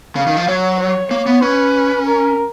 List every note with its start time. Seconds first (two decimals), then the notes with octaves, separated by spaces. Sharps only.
0.16 C#3 F5
0.27 D#3
0.37 F3
0.48 F#3 C#5
0.79 C#5
1.11 A#3 C#5
1.26 B3
1.42 C#4 B4
2.06 A#4